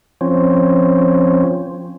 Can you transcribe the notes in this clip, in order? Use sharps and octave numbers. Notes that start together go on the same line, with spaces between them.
F3 C4 C#4